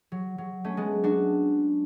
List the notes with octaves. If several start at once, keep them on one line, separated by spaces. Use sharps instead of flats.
F#3
F#3
A3 C#4
G#3 B3
D4 F#4